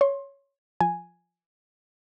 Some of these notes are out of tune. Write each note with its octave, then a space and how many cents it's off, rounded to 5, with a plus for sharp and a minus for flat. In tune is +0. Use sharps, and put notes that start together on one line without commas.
C#5 +5 C6 +25
F3 +0 G#5 +0